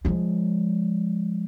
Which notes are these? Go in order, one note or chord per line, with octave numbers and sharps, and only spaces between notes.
F3 G#3